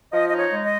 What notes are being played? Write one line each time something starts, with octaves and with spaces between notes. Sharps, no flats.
F3 D#5
D#4 D#5
C#5
G#3
D#5